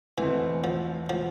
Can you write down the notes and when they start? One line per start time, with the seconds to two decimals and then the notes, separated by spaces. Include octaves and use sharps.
0.18 E2 B2 E3 A3 C4
0.64 F3
1.09 F3